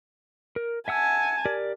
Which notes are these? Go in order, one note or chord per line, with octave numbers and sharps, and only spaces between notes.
A#4
E5 F#5 G#5 A5 E6
G4 A#4 D5